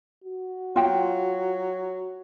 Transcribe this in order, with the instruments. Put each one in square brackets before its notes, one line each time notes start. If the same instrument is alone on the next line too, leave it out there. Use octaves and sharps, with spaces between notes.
[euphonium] F#4
[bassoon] F#3 [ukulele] F4 G5